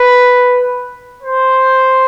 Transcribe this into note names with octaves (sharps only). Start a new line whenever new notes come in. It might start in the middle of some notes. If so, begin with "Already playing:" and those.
Already playing: B4
C5